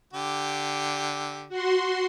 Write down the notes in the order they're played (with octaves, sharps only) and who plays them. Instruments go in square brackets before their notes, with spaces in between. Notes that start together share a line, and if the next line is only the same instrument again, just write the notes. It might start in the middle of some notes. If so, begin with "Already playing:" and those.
[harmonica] D3 G4
[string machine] F#4 C6